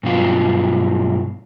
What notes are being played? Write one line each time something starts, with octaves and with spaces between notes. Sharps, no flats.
G2 B2 F#3 F4